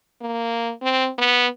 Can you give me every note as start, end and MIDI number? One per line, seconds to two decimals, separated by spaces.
0.22 0.72 58
0.82 1.09 60
1.18 1.47 59